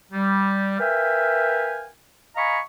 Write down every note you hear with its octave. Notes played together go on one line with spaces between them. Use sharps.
G3
A#4 B4 E5 F5 G5 G#5
D#5 F5 G#5 A#5 B5 C#6